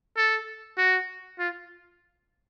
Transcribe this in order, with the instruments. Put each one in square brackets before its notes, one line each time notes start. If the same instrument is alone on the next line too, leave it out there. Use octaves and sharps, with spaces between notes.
[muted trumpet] A4
F#4
F4